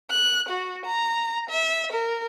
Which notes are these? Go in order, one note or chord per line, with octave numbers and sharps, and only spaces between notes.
F#6
F#4
A#5
E5
A#4